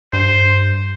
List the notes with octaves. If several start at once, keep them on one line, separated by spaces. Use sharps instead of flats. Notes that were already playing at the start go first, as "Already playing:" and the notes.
G2 C5